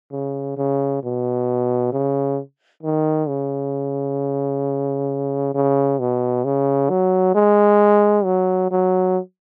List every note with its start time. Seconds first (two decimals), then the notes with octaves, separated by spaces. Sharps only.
0.12 C#3
0.57 C#3
1.03 B2
1.93 C#3
2.83 D#3
3.28 C#3
5.54 C#3
6.00 B2
6.45 C#3
6.90 F#3
7.35 G#3
8.25 F#3
8.71 F#3